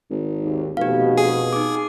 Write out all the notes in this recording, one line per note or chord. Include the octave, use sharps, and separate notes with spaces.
G#1
D#2
F1 B2 G4 F5
G#4
D#4 D6